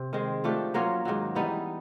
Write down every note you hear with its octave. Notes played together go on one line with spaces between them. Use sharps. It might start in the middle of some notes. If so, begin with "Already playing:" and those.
Already playing: C3
D#3 G#3 C4
F3 A3 D4 G4
F#3 A#3 C#4 F4
G#2 D#3 F#3
E3 G3 B3 D#4